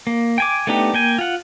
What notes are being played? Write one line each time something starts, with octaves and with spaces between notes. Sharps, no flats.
A#3
G5 G#5 D6
A3 B3 D4 D#4 G4
A#3 G5 G#5
F4 F#5